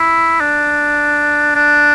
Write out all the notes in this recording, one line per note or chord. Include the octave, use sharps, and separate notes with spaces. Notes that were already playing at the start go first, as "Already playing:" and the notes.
Already playing: E4
D4
D4